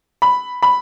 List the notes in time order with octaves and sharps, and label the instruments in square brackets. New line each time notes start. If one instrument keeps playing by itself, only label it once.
[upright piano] B5
B5